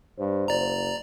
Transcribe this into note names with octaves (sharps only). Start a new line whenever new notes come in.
G2 C5
F#1 D5 A#5